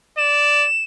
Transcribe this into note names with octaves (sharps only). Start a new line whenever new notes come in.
D5 E7